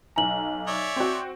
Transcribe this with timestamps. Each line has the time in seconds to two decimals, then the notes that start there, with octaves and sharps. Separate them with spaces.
0.16 B1 G#5 A#5 F#7
0.67 C#5 D5 E5
0.96 C4 F#4